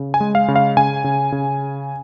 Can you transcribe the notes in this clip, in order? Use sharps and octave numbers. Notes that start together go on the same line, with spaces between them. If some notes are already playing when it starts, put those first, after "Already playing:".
Already playing: C#3
G#5
G#3
F5
C#3
F5
C#3 G#5
C#3
C#3